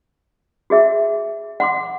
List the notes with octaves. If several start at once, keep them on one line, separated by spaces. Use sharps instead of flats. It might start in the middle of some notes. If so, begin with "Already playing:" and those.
F#4 G#4 E5 E6
F#5 C6 D6